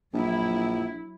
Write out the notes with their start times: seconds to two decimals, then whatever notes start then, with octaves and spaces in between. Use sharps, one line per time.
0.13 A#1 F#3 E4